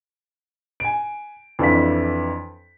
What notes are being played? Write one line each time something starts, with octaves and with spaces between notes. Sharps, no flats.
G#5 D7
F2 E3 D4 F5 B6